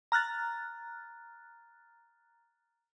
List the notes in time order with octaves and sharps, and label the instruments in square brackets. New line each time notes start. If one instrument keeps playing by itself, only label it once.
[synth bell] A#5 F6 F#6 A6